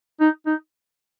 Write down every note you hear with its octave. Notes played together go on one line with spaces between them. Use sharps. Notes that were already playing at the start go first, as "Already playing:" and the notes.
D#4
D#4